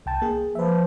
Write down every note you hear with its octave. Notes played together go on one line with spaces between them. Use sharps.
C2 G5 A5
A#3 G#4
F3 B4 E5